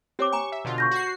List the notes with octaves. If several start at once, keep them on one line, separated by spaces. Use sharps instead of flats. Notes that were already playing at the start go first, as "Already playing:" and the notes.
C4 G4 C#5 D6
G#5 A#5 C#6
E5
B2 D3 F4
C#6 G6 A#6
F#4 C7